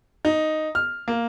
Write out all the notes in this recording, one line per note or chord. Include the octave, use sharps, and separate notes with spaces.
D#4
F6
A#3